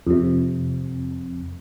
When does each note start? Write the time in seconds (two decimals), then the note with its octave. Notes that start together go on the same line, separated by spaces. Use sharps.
0.07 F2 C3